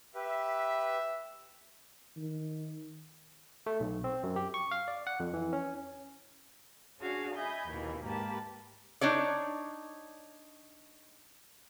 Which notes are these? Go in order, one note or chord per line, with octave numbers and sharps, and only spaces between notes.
G4 B4 E5
D#3
A3
B1
C4
F#2
G4
C#6
F5
D5
F#5
F2
E3
C#4
C#4 D4 F#4 G#4 F5
D#5 E5 G#5 B5 G6 G#6
D#2 B2 E3
G#2 A#3 G4 B4 A5
D4 D#4 C#5 D5